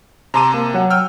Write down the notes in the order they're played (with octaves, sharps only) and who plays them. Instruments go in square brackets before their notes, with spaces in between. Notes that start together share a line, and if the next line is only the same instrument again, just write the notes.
[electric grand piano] C3 A5 D#7 [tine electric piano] A#5 C6 D6
[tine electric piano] A#3
F#3 F#5
[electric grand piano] G5 E6 F6